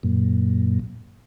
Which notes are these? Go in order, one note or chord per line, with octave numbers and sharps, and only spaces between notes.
F#2 A#2